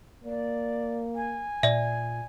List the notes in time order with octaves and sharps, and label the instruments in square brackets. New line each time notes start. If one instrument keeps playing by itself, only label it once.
[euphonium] A#3 [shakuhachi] D5
[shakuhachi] G#5
[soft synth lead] A#2 [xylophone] D5 E5